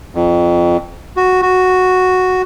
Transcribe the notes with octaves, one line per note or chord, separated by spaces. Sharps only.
F2
F#4
F#4